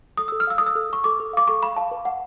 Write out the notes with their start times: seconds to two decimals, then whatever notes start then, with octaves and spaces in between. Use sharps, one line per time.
0.17 A4 D#6
0.28 A4 E6
0.40 F6
0.47 F5 E6
0.58 D#6
0.61 A4
0.66 E6
0.75 A4
0.90 A4 C#6
1.04 A4 D6
1.20 A4
1.33 F5 D6
1.48 A4 C#6
1.63 F5 B5
1.76 F5 A5
1.91 B4
2.05 F#5